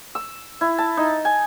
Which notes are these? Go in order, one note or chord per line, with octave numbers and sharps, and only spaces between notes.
E6
E4
A5
D#4
G#5